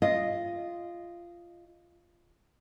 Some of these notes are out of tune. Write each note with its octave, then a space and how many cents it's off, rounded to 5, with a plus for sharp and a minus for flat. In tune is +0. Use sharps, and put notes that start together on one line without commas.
F4 -15 D#5 +0